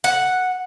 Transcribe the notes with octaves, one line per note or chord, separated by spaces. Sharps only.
F#5